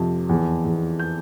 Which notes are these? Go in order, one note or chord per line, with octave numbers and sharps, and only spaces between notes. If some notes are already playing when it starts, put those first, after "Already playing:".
Already playing: F2 C3
E2
E2
G6